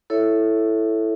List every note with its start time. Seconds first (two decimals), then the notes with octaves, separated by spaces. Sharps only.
0.10 E4 A4 C#5 E5